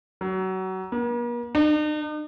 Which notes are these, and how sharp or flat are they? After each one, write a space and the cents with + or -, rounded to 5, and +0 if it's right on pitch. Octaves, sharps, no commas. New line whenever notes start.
F#3 +25
A#3 +45
D#4 -45